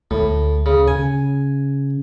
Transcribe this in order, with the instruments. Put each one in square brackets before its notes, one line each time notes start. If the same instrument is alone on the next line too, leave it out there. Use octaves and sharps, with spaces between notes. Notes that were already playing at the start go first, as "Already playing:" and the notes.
[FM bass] D2 [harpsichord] A2
[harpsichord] C#3
[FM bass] C#3 [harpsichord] G#5